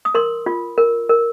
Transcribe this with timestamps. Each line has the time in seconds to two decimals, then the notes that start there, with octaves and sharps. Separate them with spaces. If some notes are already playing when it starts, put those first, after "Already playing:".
0.05 D#6
0.15 A#4 C6
0.46 F4
0.78 A#4
1.09 A#4